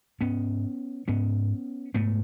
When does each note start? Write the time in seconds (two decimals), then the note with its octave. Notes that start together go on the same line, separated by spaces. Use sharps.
0.21 G#2 B3 C#4
1.08 G#2 B3 C#4
1.94 G#2 A3 B3